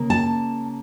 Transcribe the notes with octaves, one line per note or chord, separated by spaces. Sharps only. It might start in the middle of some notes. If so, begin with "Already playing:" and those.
Already playing: C#3 A#3
A5